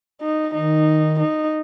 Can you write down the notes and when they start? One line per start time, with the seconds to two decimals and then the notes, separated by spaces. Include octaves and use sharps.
0.22 D#4
0.54 D#3 D#4
1.20 D#4